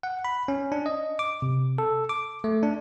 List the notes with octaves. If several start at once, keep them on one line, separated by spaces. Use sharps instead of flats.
F#5
B5
C#4
D4
D#5
D6
C3
A4
D6
A3
D4